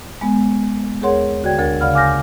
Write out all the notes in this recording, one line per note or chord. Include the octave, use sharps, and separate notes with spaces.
G#3 B3
D#2 G#4 A#4 C#5 F#5 C6
D3 F#4 D5 G5 G#6
D2 A#4 G#6 A6
C#3 D5 F5 F#5 B5 F6
F5 G#5 D6 F6 G6 A#6